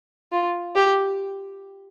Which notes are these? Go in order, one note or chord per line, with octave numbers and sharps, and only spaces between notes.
F4
G4